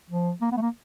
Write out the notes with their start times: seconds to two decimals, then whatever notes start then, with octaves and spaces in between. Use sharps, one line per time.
0.10 F3
0.41 A#3
0.52 B3
0.57 A3
0.61 A#3